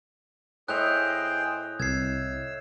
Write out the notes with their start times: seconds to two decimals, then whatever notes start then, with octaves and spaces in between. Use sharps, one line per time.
0.68 A2 G#4 C5 D#5 G5 F#6 G6 F7
1.80 C2 E6 G#6 C7